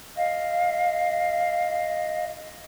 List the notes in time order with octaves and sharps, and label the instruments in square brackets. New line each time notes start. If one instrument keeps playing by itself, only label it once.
[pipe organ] D#5 [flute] F5